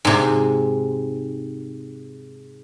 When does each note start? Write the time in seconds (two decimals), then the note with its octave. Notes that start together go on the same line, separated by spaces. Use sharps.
0.05 G#2 C3